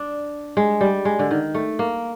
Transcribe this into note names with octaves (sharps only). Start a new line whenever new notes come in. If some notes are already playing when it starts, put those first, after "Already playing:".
Already playing: D4
G#3
G3
G#3
D3
D#3
A3
A#3